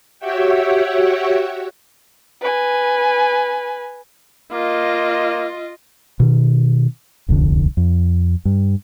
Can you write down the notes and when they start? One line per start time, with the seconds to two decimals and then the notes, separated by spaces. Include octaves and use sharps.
0.19 F#4 G4 C#5 E5 F#5 G5
2.41 B4 G#5
4.52 A#3 F4 D#5
6.20 B2 D#3
7.28 D1 C2 F2 D3
7.77 F2
8.45 G2